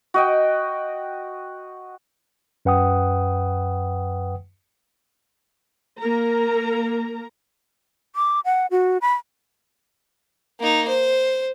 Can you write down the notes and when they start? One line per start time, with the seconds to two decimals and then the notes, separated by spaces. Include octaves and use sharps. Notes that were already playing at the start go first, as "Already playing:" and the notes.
0.14 F#4 D#5 G5
2.65 F#2 B4 F#5 G5 D#6
5.99 A#3 A#4 A#5
8.16 D6
8.45 F#5
8.71 F#4
9.02 B5
10.60 A#3 D#4
10.88 C5